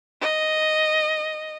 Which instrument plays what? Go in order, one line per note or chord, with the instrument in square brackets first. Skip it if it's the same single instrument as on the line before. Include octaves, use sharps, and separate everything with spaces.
[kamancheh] D#5